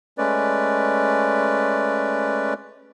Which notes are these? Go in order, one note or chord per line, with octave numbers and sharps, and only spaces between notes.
G#3 A3 C#4 B4 D5